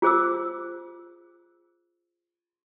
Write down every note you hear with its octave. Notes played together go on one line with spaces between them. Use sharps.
F4 G#4 C5 D6 E6